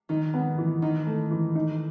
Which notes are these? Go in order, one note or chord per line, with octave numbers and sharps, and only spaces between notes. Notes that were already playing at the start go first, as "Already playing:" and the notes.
D#3 D#4
B3
E3
D#3 D#4
A3
E3
D#4